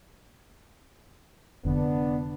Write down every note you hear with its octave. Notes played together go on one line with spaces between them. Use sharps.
F1 D3 B3 D4